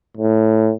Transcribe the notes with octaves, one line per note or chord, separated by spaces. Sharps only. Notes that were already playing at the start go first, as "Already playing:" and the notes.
A2